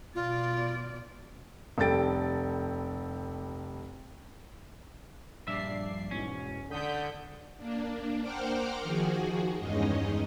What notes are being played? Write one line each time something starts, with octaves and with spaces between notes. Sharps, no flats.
B2 F4 D5
F1 G3 A4 G5 A6 D7
A#1 G2 D5 E5 C7
E2 G#2 B2 C#4
D3 D#6 G6 B6
A#3 D4
A#4 C5 F#5 G5 D6 F6
D#3 F3 F#4 G#4
E2 G2 G#3 C#4 D#4 D#5